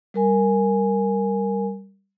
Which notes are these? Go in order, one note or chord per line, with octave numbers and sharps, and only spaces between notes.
G3 A#4 G#5